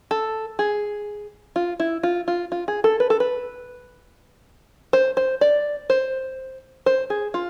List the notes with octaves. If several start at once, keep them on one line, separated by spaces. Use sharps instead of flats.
A4
G#4
F4
E4
F4
F4
F4
G#4
A4
B4
A4
B4
C5
C5
D5
C5
C5
G#4
F4